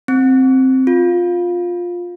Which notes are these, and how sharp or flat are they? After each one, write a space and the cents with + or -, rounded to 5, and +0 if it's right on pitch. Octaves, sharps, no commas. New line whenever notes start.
C4 +5
F4 +10